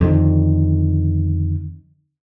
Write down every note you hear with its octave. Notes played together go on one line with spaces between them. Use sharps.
F2 D3 D#3